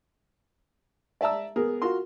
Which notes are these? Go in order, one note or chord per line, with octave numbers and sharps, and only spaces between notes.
D5 E5 A5 A#5 E6
B3 G#4 A#4
F4 F#4 A#4 C6